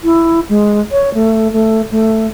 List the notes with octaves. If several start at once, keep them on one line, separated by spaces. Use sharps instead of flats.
E4
G#3
C#5
A3
A3
A3